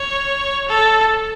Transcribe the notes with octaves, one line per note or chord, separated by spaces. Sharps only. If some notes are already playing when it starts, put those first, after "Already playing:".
Already playing: C#5
A4